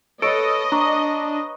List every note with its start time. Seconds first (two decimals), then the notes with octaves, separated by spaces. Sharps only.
0.22 A4 B4 C#5 D#5 D7
0.72 D4 A#5 C#6 D#6